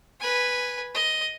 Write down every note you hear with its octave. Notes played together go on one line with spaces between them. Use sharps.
B4 G#5
D#5